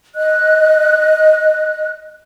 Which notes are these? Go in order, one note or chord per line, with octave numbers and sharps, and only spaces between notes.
D#5 F#6